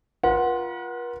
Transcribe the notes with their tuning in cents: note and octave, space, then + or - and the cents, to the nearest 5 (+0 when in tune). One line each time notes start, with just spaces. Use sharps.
F4 +0 B4 -45 F#5 +0